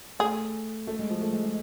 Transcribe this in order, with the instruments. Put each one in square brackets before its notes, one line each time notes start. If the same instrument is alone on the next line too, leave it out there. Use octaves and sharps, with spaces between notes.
[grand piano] A3 [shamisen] G#4
[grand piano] A3
G#3
F3
A3
G#3
G#3